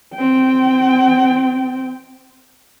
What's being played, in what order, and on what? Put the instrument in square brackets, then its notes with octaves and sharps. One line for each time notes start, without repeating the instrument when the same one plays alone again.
[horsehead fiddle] C4 G5